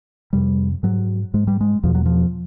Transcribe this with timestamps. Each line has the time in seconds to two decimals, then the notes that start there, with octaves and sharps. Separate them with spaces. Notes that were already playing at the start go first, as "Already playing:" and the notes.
0.33 F2 C3 G3
0.83 G#2 F#3
1.34 G#2 G#3
1.47 G3
1.61 G#3
1.83 E2 B2 F3
1.95 F#3
2.06 F3